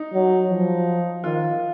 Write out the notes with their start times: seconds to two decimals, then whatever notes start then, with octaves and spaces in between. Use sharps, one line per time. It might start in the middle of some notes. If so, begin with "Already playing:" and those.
Already playing: D#4
0.13 F#3
0.50 F3
1.24 D#3 F4